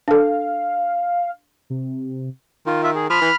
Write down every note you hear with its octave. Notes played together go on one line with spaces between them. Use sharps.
D4 A4 F5
C3
D#3 F4
F4 E5
G#4
F3 B5 F6
E3